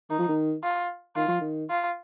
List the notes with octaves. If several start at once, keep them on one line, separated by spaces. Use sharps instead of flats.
D#3 D#4
F3
D#3
F4
D#3 F4
F3
D#3
F4